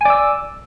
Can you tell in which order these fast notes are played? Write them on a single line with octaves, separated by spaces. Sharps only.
G#5 D5 E6